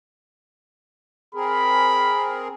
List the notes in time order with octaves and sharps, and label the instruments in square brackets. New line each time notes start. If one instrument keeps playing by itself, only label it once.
[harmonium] C4 G#4 A#4 [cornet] B5